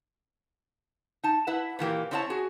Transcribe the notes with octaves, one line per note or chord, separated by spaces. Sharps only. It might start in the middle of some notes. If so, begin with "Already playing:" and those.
D#4 A5
E4 B4 E5 F#5
A#2 E3 A#3 G4
C4 C#4 E4 C#5 F5 A5
F#4 G#4